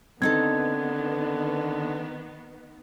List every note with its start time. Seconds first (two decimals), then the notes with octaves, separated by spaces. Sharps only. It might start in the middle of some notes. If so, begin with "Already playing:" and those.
0.22 D3 D#3 B3 C4 D#4 A4 G#6